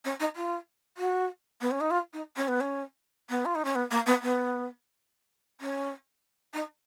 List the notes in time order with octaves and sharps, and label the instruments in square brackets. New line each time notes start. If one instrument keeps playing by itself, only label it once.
[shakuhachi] C#4
D#4
F4
F#4
B3
C#4
D#4
F4
D#4
C#4
B3
C#4
B3
F4
D#4
C#4
B3
A#3
B3
B3
C#4
D#4